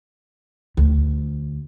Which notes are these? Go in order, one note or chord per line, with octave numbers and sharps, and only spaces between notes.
D2